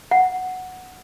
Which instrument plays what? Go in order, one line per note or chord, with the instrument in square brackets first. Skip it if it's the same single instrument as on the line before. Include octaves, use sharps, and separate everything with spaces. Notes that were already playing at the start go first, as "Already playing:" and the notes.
[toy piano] F#5